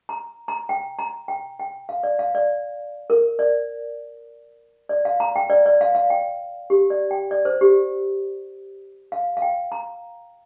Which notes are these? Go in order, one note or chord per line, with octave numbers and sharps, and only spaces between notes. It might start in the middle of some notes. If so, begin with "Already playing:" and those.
A#5
A#5
G5
A#5
G5
G5
F5
D5
F5
D5
A#4
D5
D5
F5
A#5
G5
D5
D5
F5
F5
G5
G4
D5
G5
D5
C5
G4
F5
F5
G5
A#5